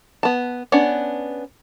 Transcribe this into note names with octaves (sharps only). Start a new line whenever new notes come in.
B3 A5
B3 C#4 D4